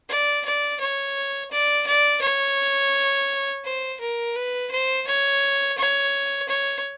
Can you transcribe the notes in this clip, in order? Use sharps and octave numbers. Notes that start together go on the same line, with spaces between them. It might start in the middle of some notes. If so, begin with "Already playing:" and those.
D5
D5
C#5
D5
D5
C#5
C5
A#4
B4
C5
C#5
C#5
C#5